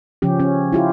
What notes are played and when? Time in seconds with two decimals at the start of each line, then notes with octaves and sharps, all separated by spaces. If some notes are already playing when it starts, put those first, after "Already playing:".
0.22 C#3 F3 C#4 G4
0.40 C#4
0.72 E4 F4 G4